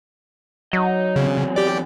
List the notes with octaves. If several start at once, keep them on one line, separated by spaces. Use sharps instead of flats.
F#3 D#4 D#5
E2 C#3 C4
G4 D5